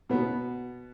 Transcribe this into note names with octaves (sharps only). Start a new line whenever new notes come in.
B2 B3